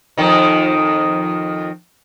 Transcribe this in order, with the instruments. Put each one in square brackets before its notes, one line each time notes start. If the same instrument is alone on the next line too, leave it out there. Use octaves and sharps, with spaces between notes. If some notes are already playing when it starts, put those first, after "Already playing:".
[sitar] F2 D#3 D#4